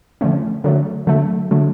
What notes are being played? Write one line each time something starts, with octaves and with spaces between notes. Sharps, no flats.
D3 F3 A3 C#4
D3 F#3 A3
D3 F#3 A3
D3 F#3 A3